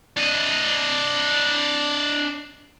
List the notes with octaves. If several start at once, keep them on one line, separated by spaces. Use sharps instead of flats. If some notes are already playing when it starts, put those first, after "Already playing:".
D4 D#5